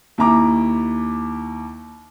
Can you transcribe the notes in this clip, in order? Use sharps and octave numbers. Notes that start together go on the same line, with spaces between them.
D#2 E4 A#5 D6